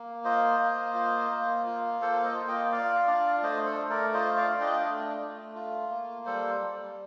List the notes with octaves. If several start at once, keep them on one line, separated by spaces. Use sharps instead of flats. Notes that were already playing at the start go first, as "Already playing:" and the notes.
Already playing: A#3
F4 C5 D#5
A#3
F4
A#3
F4
A#3 A4 C5
C5 D#5
F4
D#5 G5
F4 D5 F5
D4 D5 F5
A3 C5 D#5
A4 C5
A3
A#4 D5
F4 C5 D#5
D5 F5
D4
D#5 G5
A3
A3
F4
A#3
G3 A4 C5
G3